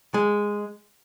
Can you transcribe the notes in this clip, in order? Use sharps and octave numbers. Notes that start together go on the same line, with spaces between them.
G#3